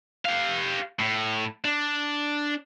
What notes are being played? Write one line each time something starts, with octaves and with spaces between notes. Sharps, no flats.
G4 F5
A2
D4